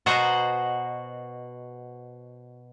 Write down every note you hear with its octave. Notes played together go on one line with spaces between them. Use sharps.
B2 F#4 C5 D#5 A#5